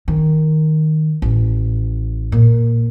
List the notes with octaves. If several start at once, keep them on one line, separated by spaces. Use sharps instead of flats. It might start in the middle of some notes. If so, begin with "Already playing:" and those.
D#3
A1
A#2